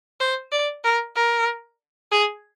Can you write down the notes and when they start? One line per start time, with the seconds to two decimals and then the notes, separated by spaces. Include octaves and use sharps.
0.20 C5
0.52 D5
0.84 A#4
1.16 A#4
2.12 G#4